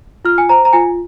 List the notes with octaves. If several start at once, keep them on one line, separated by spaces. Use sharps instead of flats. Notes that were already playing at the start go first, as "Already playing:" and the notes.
F4 F6
G#5
C5 A#5
A#5
F4 G#5